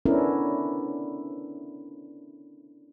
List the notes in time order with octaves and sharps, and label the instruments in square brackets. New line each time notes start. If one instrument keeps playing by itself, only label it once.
[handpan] B3 C#4 D4 E4 A4 A#4